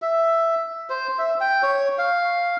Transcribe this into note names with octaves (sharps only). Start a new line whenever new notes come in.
E5
C5
E5
G5
C#5
F5